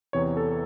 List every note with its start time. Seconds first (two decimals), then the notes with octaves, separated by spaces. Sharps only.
0.13 E2 C3 E3 C#5
0.37 A4